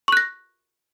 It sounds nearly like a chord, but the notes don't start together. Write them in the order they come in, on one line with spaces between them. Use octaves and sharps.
C#6 F#6 A#6